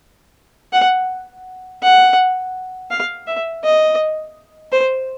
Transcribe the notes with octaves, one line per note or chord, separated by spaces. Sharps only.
F#5
F#5
F5
E5
D#5
C5